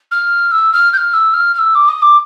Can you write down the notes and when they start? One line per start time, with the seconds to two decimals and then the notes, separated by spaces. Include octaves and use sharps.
0.11 F6
0.51 E6
0.73 F6
0.93 G6
0.97 F6
1.13 E6
1.33 F6
1.54 F6
1.58 E6
1.75 D6
1.88 D#6
2.02 D6